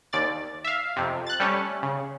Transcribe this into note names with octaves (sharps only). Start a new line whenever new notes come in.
D#2 D5 A6
E5 F5
F2 C3
F#6 A6
G3 A3 C#4
C#3